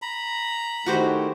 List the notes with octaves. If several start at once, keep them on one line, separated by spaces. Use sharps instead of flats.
A#5 B5
D#3 A3 E4 F#4 G4 C5